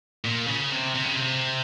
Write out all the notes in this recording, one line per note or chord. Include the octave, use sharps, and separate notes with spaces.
A#2
C#3
C3
C3
C#3
C3